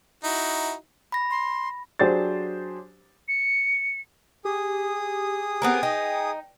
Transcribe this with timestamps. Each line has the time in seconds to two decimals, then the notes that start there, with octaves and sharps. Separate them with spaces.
0.24 D#4 E4 F#4
1.12 B5 A#6
1.31 C6
1.99 F#3 D4 G4 G#4 C5 A6
3.28 C#7
4.45 G4 G#4 D#6
5.62 B3 C4 A#4
5.83 D#4 G5